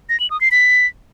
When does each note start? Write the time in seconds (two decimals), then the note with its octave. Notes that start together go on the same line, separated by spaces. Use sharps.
0.09 A#6
0.20 F#7
0.30 D#6
0.41 C7
0.51 B6